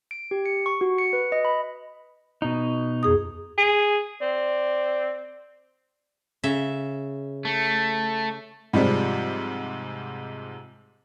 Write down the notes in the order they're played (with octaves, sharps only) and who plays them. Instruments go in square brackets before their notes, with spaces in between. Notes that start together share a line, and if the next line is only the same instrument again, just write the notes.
[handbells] D7
G4
C#7
C#6
F#4
C#7
B4
D#5
B5
[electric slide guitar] B2 D#4
[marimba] F2 G#4 D#6
[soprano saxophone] G#4
[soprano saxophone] C4 [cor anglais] D5
[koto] C#3 E5
[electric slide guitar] A3
[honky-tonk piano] G#2 C3 F3 G3 G#3